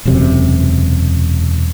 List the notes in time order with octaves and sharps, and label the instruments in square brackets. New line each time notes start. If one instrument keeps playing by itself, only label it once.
[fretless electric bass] E1 F#2 C3